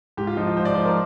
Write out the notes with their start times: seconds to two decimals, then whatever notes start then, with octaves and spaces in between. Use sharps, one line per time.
0.17 G#2 G4
0.27 F4
0.37 F3 D#4
0.47 F4
0.57 G#2 C5
0.65 D5
0.75 F3 C5
0.85 A#4